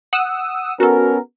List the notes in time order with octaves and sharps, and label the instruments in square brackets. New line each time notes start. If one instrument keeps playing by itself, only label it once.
[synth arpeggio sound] F#5 D#6 E6
[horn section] B3 C#4 A#4 [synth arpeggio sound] F#4 A4